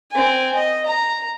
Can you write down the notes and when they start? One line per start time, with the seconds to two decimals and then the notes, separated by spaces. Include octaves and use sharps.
0.11 C4 G#5
0.55 D#5
0.86 A#5